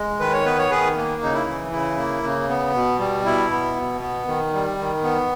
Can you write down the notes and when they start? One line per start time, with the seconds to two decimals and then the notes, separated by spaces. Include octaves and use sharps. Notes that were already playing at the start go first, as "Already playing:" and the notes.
Already playing: G#3
0.19 D#3 B4
0.33 C#5
0.45 B3 B4
0.58 C#5
0.70 D#3 G#4 B4
0.96 A#3
1.22 C#3 D#4
1.33 E4
1.47 E3
1.72 C#3 E4
1.97 A#3
2.23 C#3
2.49 B3
2.74 B2
2.99 G3
3.25 B2 E4
3.51 B3
3.76 B2
4.01 B3
4.27 D#3
4.53 G3
4.78 D#3
5.03 B3